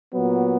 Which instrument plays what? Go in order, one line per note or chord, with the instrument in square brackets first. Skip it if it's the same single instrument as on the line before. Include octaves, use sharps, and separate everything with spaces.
[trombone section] A#2 F#3 B3